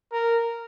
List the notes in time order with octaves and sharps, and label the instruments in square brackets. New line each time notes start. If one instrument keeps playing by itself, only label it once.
[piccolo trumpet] A#4